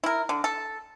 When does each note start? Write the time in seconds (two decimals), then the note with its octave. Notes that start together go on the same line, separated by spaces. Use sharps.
0.04 E4 A#4
0.29 D3
0.44 A4